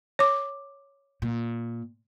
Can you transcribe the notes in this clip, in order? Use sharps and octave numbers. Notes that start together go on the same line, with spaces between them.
C#5 D6
A#2